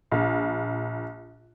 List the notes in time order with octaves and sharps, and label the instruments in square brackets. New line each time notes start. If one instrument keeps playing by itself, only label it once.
[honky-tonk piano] A#1